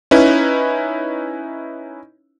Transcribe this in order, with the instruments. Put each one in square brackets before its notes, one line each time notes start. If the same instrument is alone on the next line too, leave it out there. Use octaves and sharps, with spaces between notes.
[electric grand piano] C#4 D#4 E4 B4